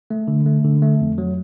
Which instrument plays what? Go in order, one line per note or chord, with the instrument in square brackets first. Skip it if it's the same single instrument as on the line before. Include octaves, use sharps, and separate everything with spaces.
[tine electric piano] A3
D3
A3
D3
A3
F2
F#3